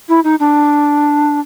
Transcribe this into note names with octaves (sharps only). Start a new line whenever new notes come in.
E4
D#4
D4